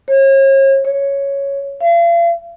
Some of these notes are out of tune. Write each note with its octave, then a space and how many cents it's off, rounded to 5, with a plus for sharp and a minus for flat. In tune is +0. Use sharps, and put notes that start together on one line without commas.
C#5 -40
C#5 +0
F5 -40